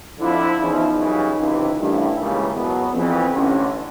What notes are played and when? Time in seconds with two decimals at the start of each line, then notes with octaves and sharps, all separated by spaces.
0.20 F2 D3 F3 E4
0.58 E2 C#3 F3 D#4
0.98 F#2 C#3 E3 G3
1.38 C#2 C3 E3
1.77 A1 G2 D#3 E4
2.16 C#2 C#3 E3 G3 A#3
2.55 E2 B2 F#3 B3
2.94 F2 C#3 E3 C4
3.34 A1 G2 D3 C#4